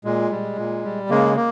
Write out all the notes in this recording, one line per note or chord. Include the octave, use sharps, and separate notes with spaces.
A#2 G#3
G3
A#2
G3
C#3 G#3 A#3
A#3